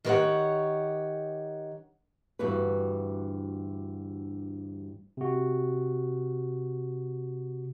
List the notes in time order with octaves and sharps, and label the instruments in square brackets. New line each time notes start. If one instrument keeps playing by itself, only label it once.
[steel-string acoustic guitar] D#3 G4 A#4 C5 C#5 F#5
[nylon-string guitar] D2 G2 E3 F#4 B4
[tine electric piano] C3 F#4